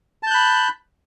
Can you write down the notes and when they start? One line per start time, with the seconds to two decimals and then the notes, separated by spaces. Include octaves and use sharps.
0.23 A5
0.27 G6
0.31 F#6
0.35 B5